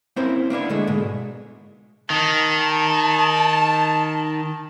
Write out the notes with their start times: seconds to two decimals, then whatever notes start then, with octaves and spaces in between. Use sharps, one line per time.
0.16 A#3 C4 C#4 E4 A#4 C5
0.50 A#3 B3 D4 E4
0.69 D3 G#3 A3
0.87 G#2 B2 G#3
2.10 D#3 A5